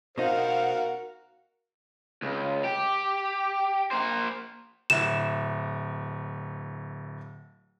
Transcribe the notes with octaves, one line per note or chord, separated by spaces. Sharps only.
B2 D#4 F#4 A#4 C5 F5 F#5
C#2
G4
A#3 C5
D1 E4 E7